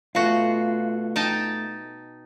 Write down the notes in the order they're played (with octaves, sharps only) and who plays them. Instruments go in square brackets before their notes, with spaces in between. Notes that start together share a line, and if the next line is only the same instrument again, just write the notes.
[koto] B2 F#4 [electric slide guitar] A3 F4
[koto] D#4 G5 A5